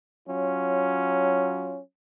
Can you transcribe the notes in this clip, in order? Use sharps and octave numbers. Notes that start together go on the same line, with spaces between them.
F#3 C#4 F4